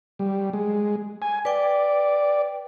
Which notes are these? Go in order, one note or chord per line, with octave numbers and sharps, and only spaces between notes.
G3
G#3
G#5
B4 D5 G5